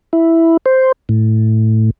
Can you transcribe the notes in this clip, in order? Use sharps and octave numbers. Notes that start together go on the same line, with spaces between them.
E4
C5
A2